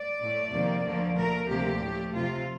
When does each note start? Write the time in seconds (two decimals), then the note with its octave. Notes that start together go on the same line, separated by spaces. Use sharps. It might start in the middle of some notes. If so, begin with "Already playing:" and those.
Already playing: D5
0.21 A2 A3
0.53 F2 C3 D#3 A#3
0.85 D2 D3 F3 A#3
1.17 A#2 A3 A#4
1.48 D2 C3 F3 A#3 G4
1.80 A2 F3 A3
2.13 F2 C3 F3 F4